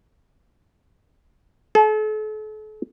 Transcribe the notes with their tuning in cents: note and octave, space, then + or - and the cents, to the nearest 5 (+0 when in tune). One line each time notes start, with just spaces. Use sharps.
A4 -40